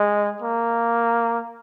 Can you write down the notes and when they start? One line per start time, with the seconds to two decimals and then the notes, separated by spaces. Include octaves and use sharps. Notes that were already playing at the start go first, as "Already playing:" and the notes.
Already playing: G#3
0.42 A#3